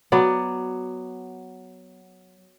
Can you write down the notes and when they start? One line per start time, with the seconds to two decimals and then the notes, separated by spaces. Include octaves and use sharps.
0.12 F#3 B3 D5